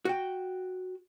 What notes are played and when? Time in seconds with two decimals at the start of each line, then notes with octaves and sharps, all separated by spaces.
0.05 F#4 G5